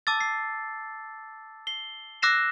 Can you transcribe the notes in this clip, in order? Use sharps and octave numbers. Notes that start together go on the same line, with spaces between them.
A5 D6 E6 A6
C7
C7 G7
D6 E6 F#6 A#6 C7 E7